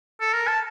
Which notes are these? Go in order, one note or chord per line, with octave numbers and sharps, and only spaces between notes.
A4
A#4
A5